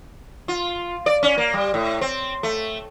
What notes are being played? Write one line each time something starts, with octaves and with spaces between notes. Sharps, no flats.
F4
D5
C#4
A#3
G3
A2
C4
A3